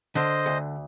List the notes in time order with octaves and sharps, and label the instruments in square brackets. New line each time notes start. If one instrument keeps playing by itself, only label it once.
[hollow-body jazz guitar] D3 [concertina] C5 D#5
[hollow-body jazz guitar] D2